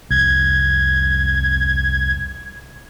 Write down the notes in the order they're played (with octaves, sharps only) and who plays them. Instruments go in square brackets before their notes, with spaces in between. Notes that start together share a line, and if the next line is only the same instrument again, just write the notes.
[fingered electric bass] C2 F2 [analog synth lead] G#6